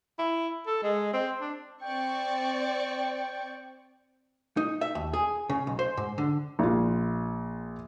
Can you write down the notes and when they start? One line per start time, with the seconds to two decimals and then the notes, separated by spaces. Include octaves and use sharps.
0.19 E4
0.67 A4
0.83 G#3
1.13 C4
1.41 D4
1.82 C4 D5 G5 C#6
4.57 D#4
4.81 E5
4.95 D#2
5.13 G#4
5.50 C#3
5.67 B1
5.79 C5
5.97 G#2
6.18 D3
6.59 A#1 F4